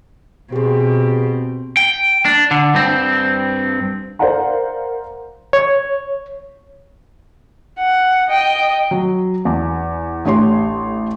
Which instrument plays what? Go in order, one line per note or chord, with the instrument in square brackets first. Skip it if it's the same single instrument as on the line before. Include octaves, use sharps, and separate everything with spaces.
[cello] B2 C4 [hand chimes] G4 G#4
[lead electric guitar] G5
D4
D3
G2 C4
[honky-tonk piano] A#4 C5 D5 F5 F#5 A#5
[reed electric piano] C#5
[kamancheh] F#5
D#5 G5
[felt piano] F#3
E2
A1 A3 D4 G4 C#5 C6